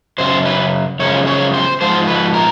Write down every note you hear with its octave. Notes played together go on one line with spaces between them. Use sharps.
F#2 C#3 C5
B4
F#2 C#3 F3 G#3 C#5
C#5
C5
G#2 F3 C5
B4
A#4